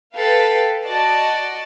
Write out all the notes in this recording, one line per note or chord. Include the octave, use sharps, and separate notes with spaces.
A4 B4 F5 G5
F#4 D5 D#5 A5